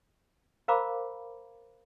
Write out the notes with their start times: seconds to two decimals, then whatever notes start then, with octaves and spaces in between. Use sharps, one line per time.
0.68 A#4 C5 F5 A#5 B5 D6